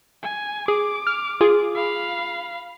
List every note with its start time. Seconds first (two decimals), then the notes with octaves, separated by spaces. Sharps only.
0.22 G#5
0.68 G#4 D6
1.07 F6
1.41 F4 G#4
1.75 F5 B5